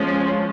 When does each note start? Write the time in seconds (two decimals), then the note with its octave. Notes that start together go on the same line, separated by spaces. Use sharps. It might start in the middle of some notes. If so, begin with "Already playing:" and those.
Already playing: F3 G#3 C#4